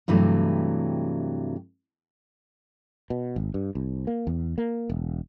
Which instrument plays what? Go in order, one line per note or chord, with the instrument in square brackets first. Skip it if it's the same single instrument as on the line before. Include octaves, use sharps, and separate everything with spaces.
[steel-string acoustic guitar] G2 C3 E3 F#3 A3
[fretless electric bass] B2
G#1
G2
C2
A#3
E2
A#3
E1